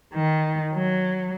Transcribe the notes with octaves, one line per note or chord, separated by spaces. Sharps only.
D#3
F#3